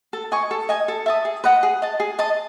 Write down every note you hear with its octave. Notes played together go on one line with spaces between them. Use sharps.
A4
D#5 G#5 C#6
A4
D#5 G#5 D#6
A4
E5 A5 D#6
G#4
B4 D#5 F#5
G#4
D#5 A5
G#4
D#5 A5 D#6